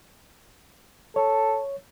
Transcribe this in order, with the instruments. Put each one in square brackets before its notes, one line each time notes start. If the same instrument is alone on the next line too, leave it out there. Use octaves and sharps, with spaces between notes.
[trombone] A4 [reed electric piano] C#5